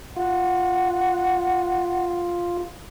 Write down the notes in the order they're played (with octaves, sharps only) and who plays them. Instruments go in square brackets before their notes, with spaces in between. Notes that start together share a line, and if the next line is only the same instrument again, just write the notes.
[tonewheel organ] F4 [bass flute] F#5